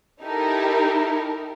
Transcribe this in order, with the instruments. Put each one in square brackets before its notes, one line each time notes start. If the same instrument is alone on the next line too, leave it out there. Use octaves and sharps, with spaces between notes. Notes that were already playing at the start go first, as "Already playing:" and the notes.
[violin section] D#4 E4 G4 A4 A#4